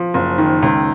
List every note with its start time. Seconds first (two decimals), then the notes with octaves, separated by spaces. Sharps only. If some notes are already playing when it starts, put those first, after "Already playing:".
Already playing: F3
0.14 F#1
0.38 D#3
0.62 C#2